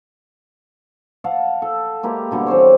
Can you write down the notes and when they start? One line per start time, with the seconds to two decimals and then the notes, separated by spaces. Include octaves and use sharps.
1.24 F5 F#5 A5
1.62 A4
2.03 G#3 A#3 E4 G4
2.31 B2 D3 G3
2.47 E3 C4 C5 C#5